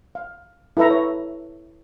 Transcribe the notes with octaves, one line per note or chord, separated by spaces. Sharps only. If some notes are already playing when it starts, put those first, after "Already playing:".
F5
E4 A4 B4 E5 A#5
C#5